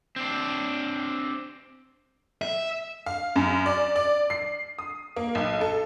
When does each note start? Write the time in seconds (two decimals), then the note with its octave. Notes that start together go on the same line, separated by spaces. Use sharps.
0.16 C4 D4
2.42 E5
3.06 F5
3.36 F#2
3.66 D5
3.96 D5
4.30 C7
4.79 D#6
5.16 A#3
5.35 B1
5.61 A4